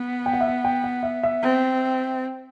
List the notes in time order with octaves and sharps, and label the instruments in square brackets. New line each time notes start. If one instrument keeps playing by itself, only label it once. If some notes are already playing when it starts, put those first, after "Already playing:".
Already playing: [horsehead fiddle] B3
[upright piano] G5
F#5
E5
F#5
G5
F#5
E5
E5
[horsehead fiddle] C4